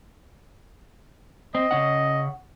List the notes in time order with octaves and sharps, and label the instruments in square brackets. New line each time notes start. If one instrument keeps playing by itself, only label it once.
[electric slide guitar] C4 [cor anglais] D#5
[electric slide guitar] C#3 C#4 F#5